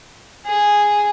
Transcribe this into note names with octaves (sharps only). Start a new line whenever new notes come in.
G#4